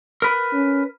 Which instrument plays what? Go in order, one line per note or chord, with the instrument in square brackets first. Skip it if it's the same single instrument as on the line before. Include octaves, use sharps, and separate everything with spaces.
[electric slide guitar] A#4 B4
[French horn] C#4